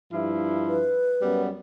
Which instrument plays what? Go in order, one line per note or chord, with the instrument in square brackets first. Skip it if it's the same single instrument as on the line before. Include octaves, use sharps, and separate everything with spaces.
[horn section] G2 F3 E4
[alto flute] B4
[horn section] F#2 G3 B3